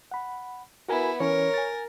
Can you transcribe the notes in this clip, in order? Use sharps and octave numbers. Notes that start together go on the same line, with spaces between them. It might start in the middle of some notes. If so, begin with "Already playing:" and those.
F#5 B5
B3 E4 F#4 A#4 G#5
E3 C#4 A#4 C#5
G#5 A6